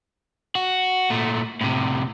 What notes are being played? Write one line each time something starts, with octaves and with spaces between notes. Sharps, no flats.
F#4
A#2 A3
A2 C3